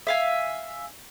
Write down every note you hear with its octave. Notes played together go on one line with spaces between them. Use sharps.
E5 F5 G#5